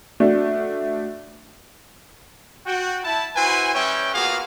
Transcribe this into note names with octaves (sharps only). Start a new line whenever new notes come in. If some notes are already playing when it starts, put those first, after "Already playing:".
A3 D4 F#4
F#4 G5
E4 A5
E4 F#4 B4 C5 G#5
G3 C#4 B4 C#5 E5 G5
A#3 B3 F4 F#4 G#4 F5